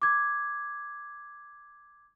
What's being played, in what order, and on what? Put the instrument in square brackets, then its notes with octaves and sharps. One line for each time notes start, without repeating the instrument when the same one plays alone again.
[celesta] D6 G#6